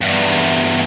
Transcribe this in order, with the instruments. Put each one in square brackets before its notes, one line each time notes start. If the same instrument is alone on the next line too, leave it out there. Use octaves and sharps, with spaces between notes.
[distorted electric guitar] E2 G2